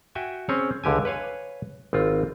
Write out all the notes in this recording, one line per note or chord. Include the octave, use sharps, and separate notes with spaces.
F#4 E5 G5 G#5
C4 C#4 G#4 C#5
C#2 D3 G4 G#5
B4 C#5 F5 G#5
G#1 C4 F4